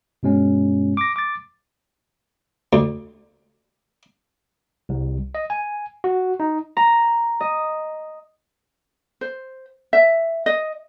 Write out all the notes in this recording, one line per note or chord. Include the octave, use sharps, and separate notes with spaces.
G2 B2 G#3 C#4
D6 A#6
D6 A6
D2
C2
D#5
G#5
F#4
D#4
A#5
D#5
C5
E5
D#5